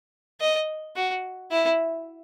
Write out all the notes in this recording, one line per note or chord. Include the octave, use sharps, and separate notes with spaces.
D#5
F#4
E4